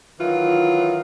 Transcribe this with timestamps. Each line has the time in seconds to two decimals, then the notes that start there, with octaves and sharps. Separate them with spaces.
0.20 D#3 E3 F#3 F4